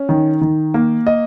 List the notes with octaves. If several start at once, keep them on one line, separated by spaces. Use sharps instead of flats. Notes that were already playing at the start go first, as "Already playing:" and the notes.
Already playing: C#4
D#3
D#3
A#3
D#5